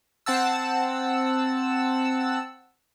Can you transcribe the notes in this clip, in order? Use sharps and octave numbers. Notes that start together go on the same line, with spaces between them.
C4 F#5 A5 E6